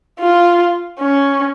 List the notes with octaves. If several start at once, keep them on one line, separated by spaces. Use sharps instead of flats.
F4
C#4